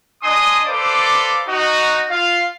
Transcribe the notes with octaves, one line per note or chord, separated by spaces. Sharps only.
D4 D#5 G#5 C6 D#6
A4 B4 C5 D5 F5 D6
D#4 F#4
F4 F5